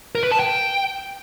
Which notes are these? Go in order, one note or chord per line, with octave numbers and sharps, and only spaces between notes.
A#4
B4
A5
G5